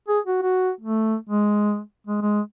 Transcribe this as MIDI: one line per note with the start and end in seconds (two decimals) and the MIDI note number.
0.08 0.19 68
0.26 0.40 66
0.42 0.71 66
0.81 1.16 57
1.29 1.80 56
2.07 2.22 56
2.22 2.41 56